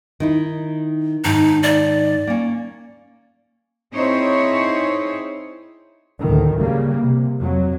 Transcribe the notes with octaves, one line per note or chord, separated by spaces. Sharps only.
D#3 D#4 E4
G#2 D#3 D#4 A5
D5
A#3 C#4
C4 D#4 E4 G#4 C5 C#5
D2 A2 D#3
C#3 G3 A#3
C3
F2 F#3